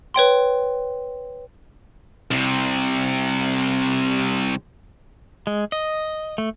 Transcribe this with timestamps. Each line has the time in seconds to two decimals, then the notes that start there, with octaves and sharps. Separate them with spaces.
0.14 B4 C#5 G5 C6
2.31 C2 C3
5.47 G#3
5.72 D#5
6.38 A3